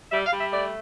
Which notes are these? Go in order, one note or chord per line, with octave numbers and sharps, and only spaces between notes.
G3 E5
F5
G3
E5
A3 D5